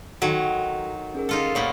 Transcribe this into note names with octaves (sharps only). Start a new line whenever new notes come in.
D#3 F#3 F#4 A4
C#4 G#4 A#4
D#4 F4 A4
F#2 A#2 B3 C#5 F#5 C#6